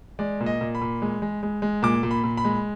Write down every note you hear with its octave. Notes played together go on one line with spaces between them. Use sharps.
G#3 D5
A#2
D#5
A#2
B5
A#2
G#3
G#3
G#3
G#3
A#2 D6
A#2
B5
A#2
B5
G#3